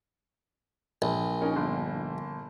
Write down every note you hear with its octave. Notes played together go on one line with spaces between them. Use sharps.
A#1
C#4 D#4 A#4
G1